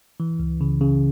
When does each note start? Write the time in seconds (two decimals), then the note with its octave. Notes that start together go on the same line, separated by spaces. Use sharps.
0.20 E3
0.39 C#2
0.61 C#3
0.81 C#3